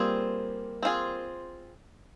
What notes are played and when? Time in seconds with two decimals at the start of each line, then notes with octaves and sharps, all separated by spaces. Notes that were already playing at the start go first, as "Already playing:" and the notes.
Already playing: G3 A#3 C4 F4 G#4
0.83 C4 F4 G#4